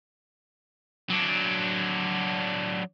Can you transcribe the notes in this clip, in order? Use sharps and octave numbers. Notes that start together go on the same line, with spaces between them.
F#3 D4